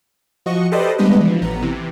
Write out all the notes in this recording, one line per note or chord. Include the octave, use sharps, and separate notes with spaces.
F3 F#4 D#5 C#6
G4 A4 B4 C5 D5 D#5
G3 G#3 B3 D4 B4 D#5
E3 F3
A1 B3 A#5
C3 E3